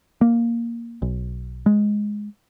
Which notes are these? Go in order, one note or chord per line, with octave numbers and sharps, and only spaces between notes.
A#3
B1
G#3